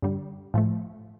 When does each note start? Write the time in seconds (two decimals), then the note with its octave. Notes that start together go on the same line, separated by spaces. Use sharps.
0.02 G2 D3 G3
0.54 A2 F3 A3